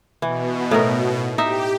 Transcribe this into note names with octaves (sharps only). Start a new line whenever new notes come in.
B2 E3
A2 D#4 A#4
D#4 G4 E5